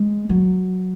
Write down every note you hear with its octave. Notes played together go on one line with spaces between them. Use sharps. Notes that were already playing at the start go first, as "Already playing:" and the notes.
Already playing: G#3
F#3